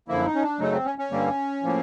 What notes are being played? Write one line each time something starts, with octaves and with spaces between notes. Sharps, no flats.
F#2 D3 F3 A#3 E4
D#4
C#4
D4
F#2 C#3 F#3 A3 D#4
C4
C#4
C#4
G2 D3 G3 A#3
A2 F3 A#3